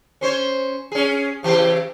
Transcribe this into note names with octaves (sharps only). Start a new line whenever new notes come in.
C#4 C5 C#5
C#4 G#4
C#3 E3 G4